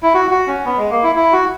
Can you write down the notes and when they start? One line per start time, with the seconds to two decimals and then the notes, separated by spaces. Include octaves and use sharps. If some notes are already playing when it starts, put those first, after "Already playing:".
0.03 E4
0.14 F#4
0.31 F#4
0.47 C#4
0.65 B3
0.77 G#3
0.90 A#3
1.03 E4
1.15 E4
1.32 F#4